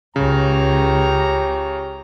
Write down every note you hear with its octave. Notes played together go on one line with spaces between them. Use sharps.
C#2 C#3 G4 C#5 A#5